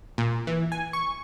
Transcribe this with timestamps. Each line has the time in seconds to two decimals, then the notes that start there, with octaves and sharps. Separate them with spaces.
0.18 A#2
0.47 E3
0.72 G#5
0.93 C#6